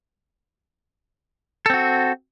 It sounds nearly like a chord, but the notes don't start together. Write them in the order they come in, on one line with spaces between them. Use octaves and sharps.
A4 C4 F#4